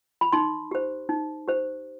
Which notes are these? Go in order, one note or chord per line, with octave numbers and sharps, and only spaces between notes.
B5
D#4 C6
G4 C5
D#4
G4 C5